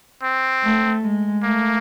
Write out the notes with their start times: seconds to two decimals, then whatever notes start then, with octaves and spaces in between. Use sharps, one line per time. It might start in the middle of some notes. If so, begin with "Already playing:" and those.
0.23 C4
0.62 A3
1.03 G#3
1.44 A3 A#3